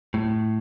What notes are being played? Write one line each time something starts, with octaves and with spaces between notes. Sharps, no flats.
A2